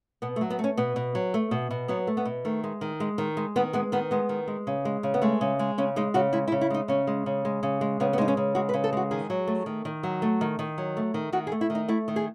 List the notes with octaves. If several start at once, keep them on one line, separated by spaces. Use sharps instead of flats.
B2 B3
A3
F#3
B3
A3
C#4
B2 B3
B2
F#3
A3
B2
B2
F#3 B3
A3
B3
B2
D#3 A3
G#3
D#3
G#3
D#3
G#3
D#3 B3
G#3 B3
D#3 B3
G#3 B3
D#3
G#3
C#3
G#3
C#3
B3
G#3 A3
C#3
G#3
C#3 C#4
G#3 D#4
C#3 F#4
G#3 E4
E4
C#3
E4
G#3 D#4
C#3 C#4
G#3
C#3
G#3
C#3
G#3
C#3 B3
B3
G#3 D#4
C#4
C#3
G#3 F#4
B4
C#3
A4
G#3 F#4
D#3 G#4
F#3
A3
D#3
D#3
F#3
A3
D#3
D#3
F#3
A3
D#3
D#3 F#4
G#4
A3
E4
D#3
D#4
A3 E4
D#3
G#4